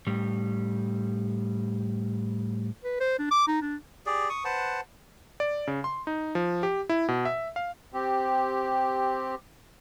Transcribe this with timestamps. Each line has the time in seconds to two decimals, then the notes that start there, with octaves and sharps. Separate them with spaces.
0.07 A2 G3
2.84 B4
3.00 C5
3.19 D4
3.31 D6
3.47 D#4
3.62 D4
4.06 G4 G#4 D5
4.29 C#6 D#6
4.45 B4 C5 F#5 A5
5.40 D5
5.67 C#3
5.84 C6
6.07 D#4
6.35 F3
6.63 G4
6.89 E4
7.08 B2
7.25 E5
7.56 F5
7.94 C4 G4